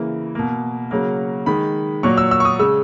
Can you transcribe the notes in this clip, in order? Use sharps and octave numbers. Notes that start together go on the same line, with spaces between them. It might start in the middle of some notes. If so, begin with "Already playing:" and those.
Already playing: C#3 E3 A#3
B2 A#3
C#3 F#3 A#3
D#3 G#3 B5
A#2 F#3 A#3 C#6
E6
E6
C#6
D#6
C#3 G#3 E6